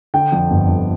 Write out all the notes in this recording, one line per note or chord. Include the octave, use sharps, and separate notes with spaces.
D3 G5
F2
G1
G1